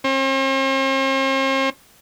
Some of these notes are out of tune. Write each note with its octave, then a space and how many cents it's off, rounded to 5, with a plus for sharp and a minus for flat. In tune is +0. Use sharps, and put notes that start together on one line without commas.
C4 +45